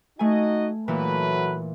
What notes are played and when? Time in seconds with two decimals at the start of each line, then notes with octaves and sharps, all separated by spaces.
0.19 A3 D#4 F#4 D#5 G#5
0.88 A#2 E3 F#3 A3 B4